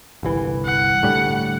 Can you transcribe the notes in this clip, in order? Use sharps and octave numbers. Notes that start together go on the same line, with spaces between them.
G1 C2 E3
F#5
A2 D3 G3